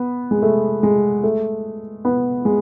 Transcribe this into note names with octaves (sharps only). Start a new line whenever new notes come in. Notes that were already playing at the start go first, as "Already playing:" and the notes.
Already playing: B3
G#3
A3
G#3
A3
B3
G#3